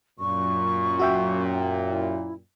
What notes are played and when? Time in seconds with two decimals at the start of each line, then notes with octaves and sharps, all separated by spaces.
0.19 F#2 A#2 C#6
0.99 F#4 E5 G5
1.88 E4